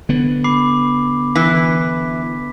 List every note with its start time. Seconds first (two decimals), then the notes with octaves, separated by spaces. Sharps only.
0.09 D3 B3
0.44 B5 D6 C7
1.36 E3 B6